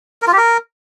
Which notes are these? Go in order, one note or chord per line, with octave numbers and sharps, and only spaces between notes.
A#4
F4
G4
A#4